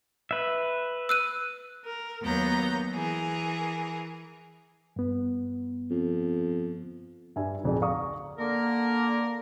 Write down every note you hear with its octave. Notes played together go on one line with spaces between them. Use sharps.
B4 E5
E6 F#6 D#7
A#4
D#2 F#3 B3 A#5 G6
E3 G#4 A#4
G2 B3
F2
G2 G4 E5 G#5
D1 B1 F2 D4 G#4
D5 F5 A#5 C#6 D#6
D3 A#3 A#4